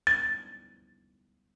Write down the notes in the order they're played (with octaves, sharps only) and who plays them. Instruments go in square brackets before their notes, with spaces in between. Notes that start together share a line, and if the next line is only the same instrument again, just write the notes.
[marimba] A6